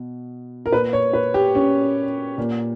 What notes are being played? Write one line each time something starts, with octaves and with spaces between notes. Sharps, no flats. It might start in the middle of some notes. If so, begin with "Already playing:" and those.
Already playing: B2
A#4
A#2 B4
C#5
B4
G4
C#4
A#2